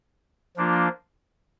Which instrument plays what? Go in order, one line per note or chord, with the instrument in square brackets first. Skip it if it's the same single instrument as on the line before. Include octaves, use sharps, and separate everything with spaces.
[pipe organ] F3 A#3 D4 F4